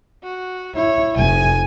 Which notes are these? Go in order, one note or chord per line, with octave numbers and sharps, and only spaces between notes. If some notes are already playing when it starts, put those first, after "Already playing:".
F#4
E4 C#5
F1 G#5